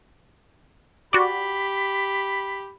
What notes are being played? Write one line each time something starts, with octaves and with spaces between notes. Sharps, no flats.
F#4 G4 D5 B5